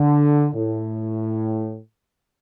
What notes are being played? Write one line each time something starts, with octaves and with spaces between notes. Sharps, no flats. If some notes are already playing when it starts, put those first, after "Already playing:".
Already playing: D3
A2